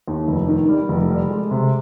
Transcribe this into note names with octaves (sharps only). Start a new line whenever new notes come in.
D#2
F1
D#3
G3
F1
G3
G#3
C3